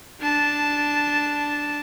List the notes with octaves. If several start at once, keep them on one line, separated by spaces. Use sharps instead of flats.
D4 A5